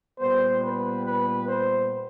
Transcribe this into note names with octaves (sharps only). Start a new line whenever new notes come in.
A#2 G3 B3 C5
B4
B4
C5